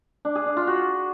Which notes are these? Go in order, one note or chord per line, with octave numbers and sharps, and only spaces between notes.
D4
G#4
D4
F4
F#4